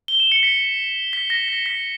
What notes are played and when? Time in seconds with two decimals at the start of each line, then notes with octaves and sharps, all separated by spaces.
0.08 G7
0.20 E7
0.32 C#7
0.43 B6
1.13 B6
1.30 A#6
1.48 A#6
1.66 B6